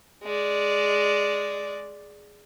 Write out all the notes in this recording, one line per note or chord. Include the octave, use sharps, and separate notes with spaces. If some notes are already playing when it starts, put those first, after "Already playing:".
G#3 D5